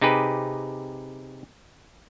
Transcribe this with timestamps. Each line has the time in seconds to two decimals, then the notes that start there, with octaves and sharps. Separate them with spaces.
0.01 C3 D#4 G4 G#4 B4